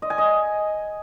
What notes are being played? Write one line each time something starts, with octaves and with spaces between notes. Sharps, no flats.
D#5
G#5
D#5